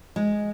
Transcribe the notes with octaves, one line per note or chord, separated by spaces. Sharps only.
G#3